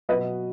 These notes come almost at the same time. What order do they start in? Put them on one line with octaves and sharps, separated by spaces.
F#3 B4 D#5 B2